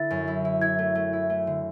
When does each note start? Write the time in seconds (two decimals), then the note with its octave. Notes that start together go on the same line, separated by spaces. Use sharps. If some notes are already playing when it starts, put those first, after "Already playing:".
Already playing: D3 E4 A6
0.10 F#2
0.28 E4
0.45 E4
0.62 E4 G#6
0.79 A3
0.95 A3
1.13 E4
1.30 A3
1.47 D3